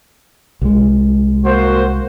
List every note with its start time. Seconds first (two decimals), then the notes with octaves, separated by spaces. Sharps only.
0.62 C2 G#3
1.45 A#3 F#4 C5